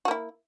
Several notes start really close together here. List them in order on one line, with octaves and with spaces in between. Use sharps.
F#4 A#3 E4